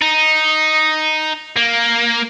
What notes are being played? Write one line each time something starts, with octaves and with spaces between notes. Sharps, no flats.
D#4
A#3